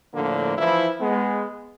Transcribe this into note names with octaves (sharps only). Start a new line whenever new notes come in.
A2 D3 F3 A#3
E3 F3 E4
G#3 B3